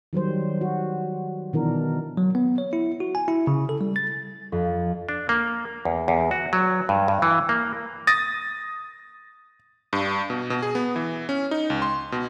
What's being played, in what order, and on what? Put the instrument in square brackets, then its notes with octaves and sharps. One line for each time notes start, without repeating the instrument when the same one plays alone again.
[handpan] D#3 F#3 G3 C5
F#4
B2 D#3 E3 D4 A#4
[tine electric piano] F#3
B3
C#5
E4
F#4
G#5
E4
C#3
A4
G3
A6
[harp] F2
[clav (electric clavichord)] D4
A#3
E2
E2
F#4
F#3
G2
G2
E3
A#3
[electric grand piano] D#6 A6 A#6
G2
B2
B2
G#4
B3
E3
C#4
D#4
C#2
C6
B2